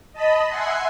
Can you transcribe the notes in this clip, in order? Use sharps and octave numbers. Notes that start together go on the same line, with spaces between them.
D#5 A5 B5
E5 F#5 G#5 C6